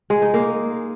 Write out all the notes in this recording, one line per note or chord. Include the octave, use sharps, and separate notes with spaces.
G#3
D#4
A#3